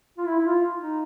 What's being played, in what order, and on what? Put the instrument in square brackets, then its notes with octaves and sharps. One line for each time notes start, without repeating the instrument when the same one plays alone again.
[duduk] F4
E4
E4
F4
D#4